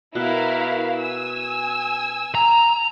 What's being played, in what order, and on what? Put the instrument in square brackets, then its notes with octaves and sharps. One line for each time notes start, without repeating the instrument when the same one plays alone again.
[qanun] B2 [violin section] E4 A#4 F5
[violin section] G#5 E6
[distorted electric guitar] A#5